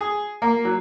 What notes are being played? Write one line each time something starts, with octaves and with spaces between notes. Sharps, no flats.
G#4
A#3
F#3